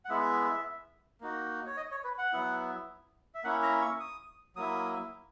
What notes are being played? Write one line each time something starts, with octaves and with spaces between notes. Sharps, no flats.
F#5
G#3 B3 E4 E5
A#3 D#4 F#4
C#5
D#5
C#5
B4
F#5
F#3 B3 E4
E5
A#3 C#4 E4 F#5
A#5
C#6
D#6
F#3 A#3 E4 D#6